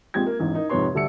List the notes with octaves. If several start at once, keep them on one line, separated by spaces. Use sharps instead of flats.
A#1 G#3 C4 G4 G#6
A#3
A1 E2 G#2
D#4 A#4
F2 G#2 C3 B4 C#5 C6
D2 G3 A3 A4 E6 C#7